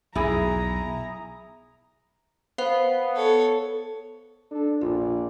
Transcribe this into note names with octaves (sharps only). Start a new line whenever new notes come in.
B1 E2 E4 G#4 A#5
B3 C5 F5
A4 C#5
D4 A4
A#1 F4 D5